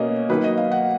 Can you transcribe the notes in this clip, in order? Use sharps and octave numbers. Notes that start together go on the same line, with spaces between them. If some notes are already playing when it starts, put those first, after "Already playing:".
Already playing: B2 A#3 C#4 D#5
D#3 F#3 A#3 D#4 B4
D#5
F5
F#5